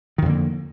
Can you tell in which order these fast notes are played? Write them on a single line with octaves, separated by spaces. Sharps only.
D#3 F2 D3 A#3